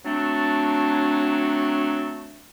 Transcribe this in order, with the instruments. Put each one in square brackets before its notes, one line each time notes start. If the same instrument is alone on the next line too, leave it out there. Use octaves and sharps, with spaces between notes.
[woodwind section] F#3 A3 C4 D4